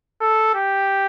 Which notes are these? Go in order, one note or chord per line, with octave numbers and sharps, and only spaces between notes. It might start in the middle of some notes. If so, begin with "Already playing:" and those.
A4
G4